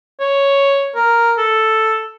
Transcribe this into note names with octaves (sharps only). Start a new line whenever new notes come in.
C#5
A#4
A4